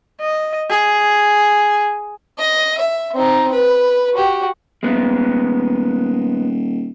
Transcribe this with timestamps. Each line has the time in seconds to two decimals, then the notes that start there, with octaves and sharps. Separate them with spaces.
0.21 D#5
0.70 G#4
2.39 D#5
2.78 E5
3.14 C4 D#4
3.52 B4
4.14 F#4 G4
4.83 D#1 G#3 B3